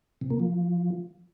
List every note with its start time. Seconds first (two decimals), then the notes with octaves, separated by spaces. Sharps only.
0.21 C3
0.30 A#3
0.40 F3